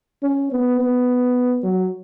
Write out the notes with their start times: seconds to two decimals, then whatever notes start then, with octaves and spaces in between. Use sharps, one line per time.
0.23 C#4
0.52 B3
0.80 B3
1.63 F#3